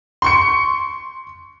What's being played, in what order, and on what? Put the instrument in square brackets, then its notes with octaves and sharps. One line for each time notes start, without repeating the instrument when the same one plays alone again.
[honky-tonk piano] C6 C#6 C#7